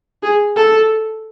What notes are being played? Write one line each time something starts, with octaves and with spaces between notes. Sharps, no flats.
G#4
A4